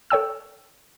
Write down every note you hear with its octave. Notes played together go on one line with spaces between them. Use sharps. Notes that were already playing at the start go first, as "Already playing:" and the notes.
A4 C#5 G5 E6